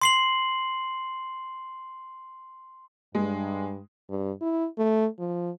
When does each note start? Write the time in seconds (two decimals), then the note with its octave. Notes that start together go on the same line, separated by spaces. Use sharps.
0.02 C6 C7 F#7
3.15 G2 G#3
4.09 G2
4.41 E4
4.78 A3
5.19 F3